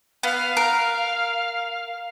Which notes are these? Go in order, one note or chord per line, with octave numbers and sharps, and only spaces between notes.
B3 F5
A#4